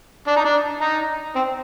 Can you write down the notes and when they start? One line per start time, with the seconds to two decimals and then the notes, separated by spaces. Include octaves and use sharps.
0.27 D4
0.36 D#4
0.44 D4
0.81 D#4
1.35 C4